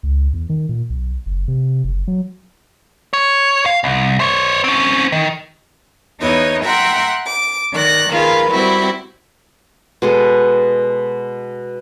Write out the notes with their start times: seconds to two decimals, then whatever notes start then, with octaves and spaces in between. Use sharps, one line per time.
0.03 C#2
0.33 E2
0.49 D#3
0.69 A#2
0.90 B1
1.26 F#1
1.48 C3
1.84 F#1
2.08 F#3
3.13 C#5
3.66 F5
3.84 C2
4.20 C5 C#5
4.64 C4 C#4
5.12 D#3
6.20 E2 B3 D#4 E4 C#5 D#5
6.64 E5 F#5 G5 A#5 C6 F#6
7.25 D6
7.72 D#3 D5 F#6 A#6
8.11 D#3 A#3 F4 G#4 A#4 B4
8.50 G3 C4 E4 F#4
10.02 B2 G#3 A4